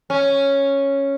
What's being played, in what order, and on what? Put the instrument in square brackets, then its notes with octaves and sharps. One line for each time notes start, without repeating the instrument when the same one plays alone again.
[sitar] C#4